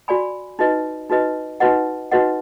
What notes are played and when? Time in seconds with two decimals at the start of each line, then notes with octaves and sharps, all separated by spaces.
0.08 F#4 D5 G#5 B5
0.59 D#4 F#4 B4 D#5
1.09 D#4 F#4 B4 D#5
1.60 D#4 F#4 B4 D#5 F#5
2.12 D#4 F#4 B4 D#5 F#5